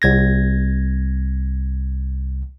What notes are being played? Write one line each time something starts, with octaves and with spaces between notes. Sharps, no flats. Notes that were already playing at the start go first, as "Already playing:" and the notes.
C2 G#6 A#6